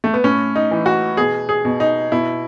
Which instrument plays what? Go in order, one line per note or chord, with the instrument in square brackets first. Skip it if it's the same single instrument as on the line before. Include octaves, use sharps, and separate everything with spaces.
[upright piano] A3
B3
A2 C#4
D#4
E3
F#4
B2 G#4
G#4
B2
D#4
B2 E4